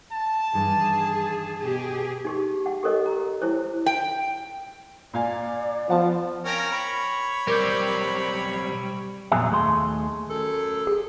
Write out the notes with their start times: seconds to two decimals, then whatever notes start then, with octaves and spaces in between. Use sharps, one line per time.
0.11 A5
0.53 G2 D#3 E3 G#4
1.61 B2 G4 G#4
2.25 D#4 G4 G#4
2.66 F#5
2.83 G4 A4 A#4 C#5 D#5
3.06 A#5
3.42 E4 C5 C#5
3.86 G5
5.14 A#2 D5 F5 G#5
5.90 F3 B3 F#5 A5
6.45 C4 C#4 A#4
6.72 C#5 B5
7.47 B1 G3 C4 A#4 D6 G6
9.32 F2 A#2 F#3 B3 G#4 E5
9.50 D#2 A3 G#4 F#5 C6
10.30 F#2 A4
10.87 G#4